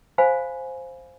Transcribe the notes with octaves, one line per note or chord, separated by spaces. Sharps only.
C5 F5 G#5 B5